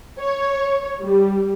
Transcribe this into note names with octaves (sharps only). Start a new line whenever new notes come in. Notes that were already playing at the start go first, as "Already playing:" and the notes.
C#5
G3